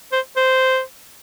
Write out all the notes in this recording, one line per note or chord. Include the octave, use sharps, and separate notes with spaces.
C5
C5